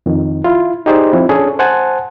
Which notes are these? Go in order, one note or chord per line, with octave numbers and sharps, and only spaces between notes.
F2 D#3
E4 F4
D#4 G4 G#4 C5 D5
F3 C4 E4
C#4 D4 G#4 A4
C5 F#5 G#5 A5